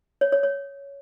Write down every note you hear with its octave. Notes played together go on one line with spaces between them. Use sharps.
C#5
C#5
C#5